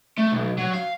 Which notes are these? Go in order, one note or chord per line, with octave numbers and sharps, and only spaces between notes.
A3
B1
F#3
F5